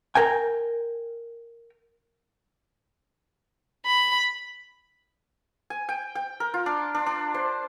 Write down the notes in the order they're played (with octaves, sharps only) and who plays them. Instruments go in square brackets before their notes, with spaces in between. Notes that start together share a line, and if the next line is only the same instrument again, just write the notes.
[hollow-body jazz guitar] A#4 G5 G#5
[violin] B5
[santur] G#5
G5
G5
A#4
F4
D4
D4
D4
C5